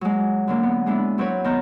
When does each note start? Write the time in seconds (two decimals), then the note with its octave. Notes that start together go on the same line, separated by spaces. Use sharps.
0.01 F#3 G#3
0.48 D3 F#3 A#3
0.63 B3
0.86 G#3 B3 D4 E4
1.18 F#3 C4 B4 C#5
1.44 D#3 B3 A#5 G6